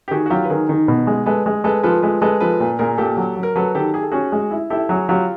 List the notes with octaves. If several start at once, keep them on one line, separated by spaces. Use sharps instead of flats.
G4
D#3 F#4 G#4
F#4
F#3 F4 G4
B4
D#3 G#4 A#4
D#3
B2
G#3
G#3 A4 B4
G#3
G#3 A4 B4
F3 A4 B4
G#3 A4 B4
G#3 A4 B4
F3 A4 B4
A#2
A#2 G#4 A#4
A#2 G4 A4
F#3
F#3
A#4
F#3 A4 B4
D#3 G4 A4
G4 G#4
A4
C#4 F#4 G#4
G#3
E4
E4 G4 A4
F#3 F#4 G#4
F#3 F4 G4